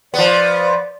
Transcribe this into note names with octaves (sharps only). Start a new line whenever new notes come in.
F3 B3 D5